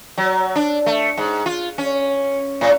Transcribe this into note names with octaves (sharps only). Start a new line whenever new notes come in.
F#3
D4
A3
G#2
F4
C#4
A2